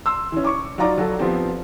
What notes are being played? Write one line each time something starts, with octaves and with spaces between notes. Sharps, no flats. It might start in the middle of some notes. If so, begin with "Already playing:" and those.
C6 E6
E3 C#4
C#6 D6
F#3 D#4 F4 D5 A#5 D6
F#3 F#4 A4
F3 B3 C4 G4